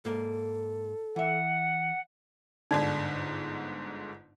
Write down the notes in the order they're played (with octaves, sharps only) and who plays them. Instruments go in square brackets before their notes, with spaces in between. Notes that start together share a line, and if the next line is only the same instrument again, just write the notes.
[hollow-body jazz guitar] G#2 A#3 [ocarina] A4
[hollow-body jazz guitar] E3 E5 [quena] F#5
[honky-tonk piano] G1 G#2 D3 [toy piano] D#4 D5